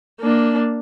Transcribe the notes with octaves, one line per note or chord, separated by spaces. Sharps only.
A#3 D4